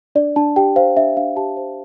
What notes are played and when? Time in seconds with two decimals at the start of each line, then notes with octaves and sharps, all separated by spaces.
0.15 D4 D5
0.36 D4 A5
0.56 G4 G5
0.76 C5 F5
0.97 D4 E5
1.17 D4 F5
1.36 G4 A5
1.57 C5